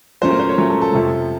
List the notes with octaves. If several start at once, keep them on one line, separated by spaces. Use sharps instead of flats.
A#2 F#3 A3 C#4 C5
A#4
C5
C#5
A#2 F#3 A3 C#4
A4
A4
F2 C3 F3